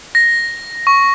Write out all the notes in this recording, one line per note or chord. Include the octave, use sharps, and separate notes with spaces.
A#6
C#6